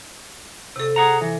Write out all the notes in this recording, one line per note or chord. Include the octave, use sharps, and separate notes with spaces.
C3 A4
G#4 F#5 A#5
E3